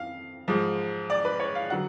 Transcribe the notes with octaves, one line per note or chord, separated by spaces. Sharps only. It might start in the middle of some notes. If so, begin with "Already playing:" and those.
Already playing: F2 F5
G#2 F3
D5
B4
C#5
F5
D3 F#3 F#5